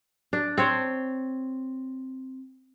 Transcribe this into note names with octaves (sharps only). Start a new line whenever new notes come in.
D4
C4 C5 C#5